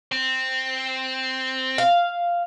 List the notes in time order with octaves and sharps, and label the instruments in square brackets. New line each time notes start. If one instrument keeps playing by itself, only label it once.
[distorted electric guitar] C4
[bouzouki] F5